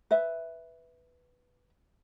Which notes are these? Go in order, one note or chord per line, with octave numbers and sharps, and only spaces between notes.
B4 E5